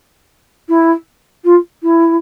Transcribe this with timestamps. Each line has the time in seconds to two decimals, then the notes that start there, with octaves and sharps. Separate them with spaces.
0.68 E4
1.44 F4
1.82 E4